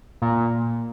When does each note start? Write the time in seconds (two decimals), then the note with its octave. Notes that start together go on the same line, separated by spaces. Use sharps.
0.22 A#2